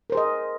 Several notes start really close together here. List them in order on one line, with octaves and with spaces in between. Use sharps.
A#4 C5 G#4 D#5